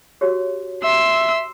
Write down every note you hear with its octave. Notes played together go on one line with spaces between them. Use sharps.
F#4 G4 C#5
E5 C6 E6